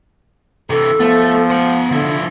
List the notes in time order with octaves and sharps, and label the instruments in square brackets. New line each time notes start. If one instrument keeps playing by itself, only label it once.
[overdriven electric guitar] C3 E3 [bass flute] A4
[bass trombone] F3 [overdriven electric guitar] A3 [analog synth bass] B3
[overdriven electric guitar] C5 F#5
[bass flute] D3 [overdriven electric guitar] F3 E4